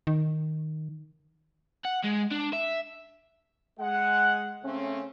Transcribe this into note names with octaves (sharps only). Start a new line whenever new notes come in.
D#3
F#5
G#3
D4
E5
G#3 F#5
C#3 A3 C4 C#4